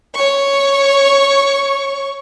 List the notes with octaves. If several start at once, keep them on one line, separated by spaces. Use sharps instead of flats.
C#5 C#6